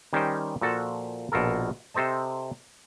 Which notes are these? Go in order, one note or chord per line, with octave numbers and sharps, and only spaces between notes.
D#3 G3 C#4 D#4 C5 G5
A#2 F3 F#4 A4 F#5 A5
A#1 B2 F4 A4 A#4
C3 A4 C5 D#5 A5